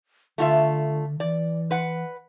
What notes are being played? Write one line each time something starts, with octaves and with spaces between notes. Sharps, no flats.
D3 A3 F4 E5
E3 D5
B4 F#5